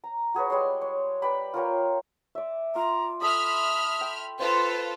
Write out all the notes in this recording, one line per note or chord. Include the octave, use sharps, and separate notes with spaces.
A#5
F#4 G#4 B4 C#5
G3 G#3 C#5 C6
C#5
G4 B4 D5 B5
F4 A#4 C#5 G5
D5 E5
F4 A#5 D6
A4 E5 B5 D#6 F6
G5
F4 A4 B4 C5 C6